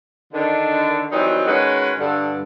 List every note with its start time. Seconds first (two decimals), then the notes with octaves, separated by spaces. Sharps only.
0.33 D3 D#3 D4
1.12 D#3 E3 F#3 G3 C4 D#4
1.47 D#3 G#3 C#4 F#4 B4
1.99 G2 D3